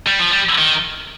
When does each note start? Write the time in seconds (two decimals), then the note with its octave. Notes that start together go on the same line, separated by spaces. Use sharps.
0.07 G3
0.19 F3
0.32 G3
0.58 D#3